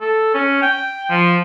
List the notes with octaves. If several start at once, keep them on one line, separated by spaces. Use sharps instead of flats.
A4
C#4
G5
F3